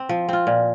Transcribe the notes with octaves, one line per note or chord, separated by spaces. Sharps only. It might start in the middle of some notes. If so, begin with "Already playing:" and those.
Already playing: C4
F3
C4 F4
A#2